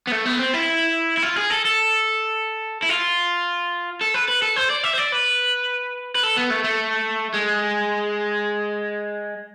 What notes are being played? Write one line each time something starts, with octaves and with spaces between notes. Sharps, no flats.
B3
A3
B3
C4
E4
E4
F4
G#4
A4
A4
E4
F4
A4
B4
B4
A4
C5
D5
E5
C5
D5
B4
B4
A4
B3
A3
A3
G#3